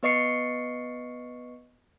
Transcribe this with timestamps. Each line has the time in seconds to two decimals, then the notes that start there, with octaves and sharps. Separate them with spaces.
0.03 B3 B4 D#5 C#6 C7 C#7